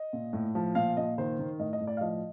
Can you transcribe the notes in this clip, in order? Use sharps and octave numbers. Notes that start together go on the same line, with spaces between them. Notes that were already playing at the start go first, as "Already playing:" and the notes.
Already playing: D#5
A#2
A2
F3
A#2 F5
A#2 D#5
D#3 C5
D#3
A2 D#5
D#5
A2
D5
F5
F3 D#5